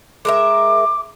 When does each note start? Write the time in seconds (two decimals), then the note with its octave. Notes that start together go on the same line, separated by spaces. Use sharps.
0.25 G#3 A#4 E5 D6